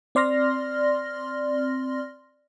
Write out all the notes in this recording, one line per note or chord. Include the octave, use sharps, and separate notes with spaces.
C4 D5 C6 F6 A#6